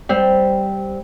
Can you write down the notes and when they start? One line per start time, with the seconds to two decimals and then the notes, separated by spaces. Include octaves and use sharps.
0.09 G3 C4